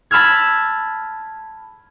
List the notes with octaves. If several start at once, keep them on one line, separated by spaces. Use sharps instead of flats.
A5 B5 E6 F6 G#6